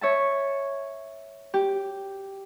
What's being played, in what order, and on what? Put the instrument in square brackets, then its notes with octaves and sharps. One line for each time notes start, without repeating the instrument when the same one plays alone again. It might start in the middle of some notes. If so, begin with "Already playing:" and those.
[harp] C#5 E5 A5
G4